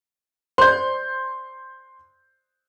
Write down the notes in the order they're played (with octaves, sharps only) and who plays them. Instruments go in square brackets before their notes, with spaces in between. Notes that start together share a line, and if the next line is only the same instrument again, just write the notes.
[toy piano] C5 D5 [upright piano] C6 G6